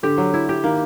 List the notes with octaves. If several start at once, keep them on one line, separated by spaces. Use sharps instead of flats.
D3 G4
F#3
E4
G4
D#3 A#3